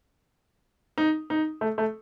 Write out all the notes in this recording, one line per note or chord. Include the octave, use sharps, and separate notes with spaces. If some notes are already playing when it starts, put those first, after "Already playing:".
D#4
D#4
A3
A3